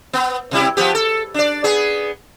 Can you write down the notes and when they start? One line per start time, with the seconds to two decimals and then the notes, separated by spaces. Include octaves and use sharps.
0.13 B3
0.51 C3 G3 E4
0.77 F3 B3 G4
0.95 A4
1.34 D4 D5
1.64 B3 G#4